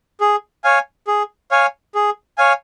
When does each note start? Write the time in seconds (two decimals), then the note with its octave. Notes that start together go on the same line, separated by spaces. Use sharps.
0.21 G#4
0.64 C#5 F5 G#5
1.07 G#4
1.51 C#5 F5 G#5
1.95 G#4
2.38 C#5 F5 G#5